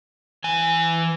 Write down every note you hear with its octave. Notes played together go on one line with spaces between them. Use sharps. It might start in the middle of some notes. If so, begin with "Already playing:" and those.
E3 G#5